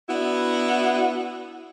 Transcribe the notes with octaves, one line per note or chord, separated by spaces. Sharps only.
B3 D4 E4 F#4